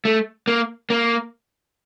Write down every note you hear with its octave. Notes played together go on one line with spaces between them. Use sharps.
A3
A#3
A#3